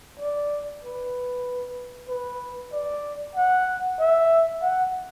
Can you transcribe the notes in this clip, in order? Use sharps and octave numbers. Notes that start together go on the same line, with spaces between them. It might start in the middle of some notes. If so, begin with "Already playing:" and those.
D5
B4
B4
D5
F#5
E5
F#5